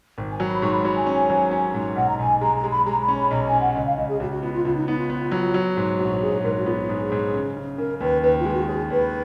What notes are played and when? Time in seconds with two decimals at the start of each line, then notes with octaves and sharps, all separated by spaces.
0.18 G#1
0.32 G#5
0.40 F#3
0.47 B5
0.62 G#2 C#6
0.73 B5
0.84 F#3 B5
0.96 G#5
1.06 C#4
1.30 F#3
1.51 C#4
1.74 G#2
1.96 B1 F#5
2.09 A#5
2.18 B1 G#5
2.41 G#3 A#5
2.56 A#5
2.64 G#3
2.71 B5
2.86 G#3 A#5
3.01 B5
3.08 C#4
3.16 B5
3.31 B1 A#5
3.46 G#5
3.53 C#4
3.60 F#5
3.75 C#2 D#5
3.86 F5
3.98 C#2 D#5
4.09 G#4
4.20 C#2 F#4
4.31 F#4
4.43 B3 F4
4.53 F4
4.65 C#2 F4
4.76 D#4
4.87 B3 D#4
4.99 F4
5.10 B3
5.31 F#3
5.54 F#3
5.77 G#2
5.99 A#1 F#4
6.21 A#1 G#4
6.44 G#2 A#4
6.56 F#4
6.66 B3 F4
6.73 F#4
6.77 G#4
6.89 G#2
7.12 G#2
7.34 C#3
7.56 C#3
7.78 C#3 A#4
8.00 D#2 B4
8.23 D#2 B4
8.39 F4
8.45 G#3 G#4
8.53 F#4
8.67 D#2 G#4
8.90 D#2 B4